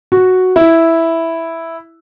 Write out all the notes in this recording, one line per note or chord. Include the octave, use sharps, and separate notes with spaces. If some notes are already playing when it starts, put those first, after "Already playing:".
F#4
E4